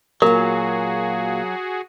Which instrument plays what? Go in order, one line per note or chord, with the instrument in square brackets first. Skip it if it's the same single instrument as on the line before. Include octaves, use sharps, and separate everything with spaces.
[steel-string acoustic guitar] A#2 A#3 [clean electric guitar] F#3 [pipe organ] F#4 G#4 [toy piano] A#4